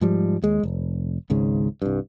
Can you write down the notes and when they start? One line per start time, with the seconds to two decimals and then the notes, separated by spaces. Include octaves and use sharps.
0.01 G#2 F3 G3
0.42 D#2 G#3
0.63 F1
1.30 G#1 C#2 G#2 C#3
1.82 C2 G2